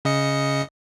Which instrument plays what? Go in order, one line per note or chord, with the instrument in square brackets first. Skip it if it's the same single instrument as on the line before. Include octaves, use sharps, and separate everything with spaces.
[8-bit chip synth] C#3 D#5 C#7